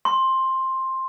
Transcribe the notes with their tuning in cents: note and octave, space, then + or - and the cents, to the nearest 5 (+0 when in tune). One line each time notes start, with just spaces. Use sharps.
C6 +10